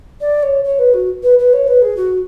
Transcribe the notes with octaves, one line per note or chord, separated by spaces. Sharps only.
D5
C#5
C#5
B4
F#4
B4
B4
C#5
B4
G#4
F#4